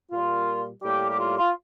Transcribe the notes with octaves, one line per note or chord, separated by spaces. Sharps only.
A#2 G3 A#3 F4
A2 G3 A#3 G4
G4
F4
F4